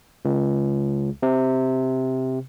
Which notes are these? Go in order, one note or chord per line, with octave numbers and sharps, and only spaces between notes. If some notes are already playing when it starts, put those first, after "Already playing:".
C#2
C3